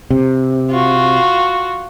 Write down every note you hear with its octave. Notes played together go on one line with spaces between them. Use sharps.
C3
F4 F#4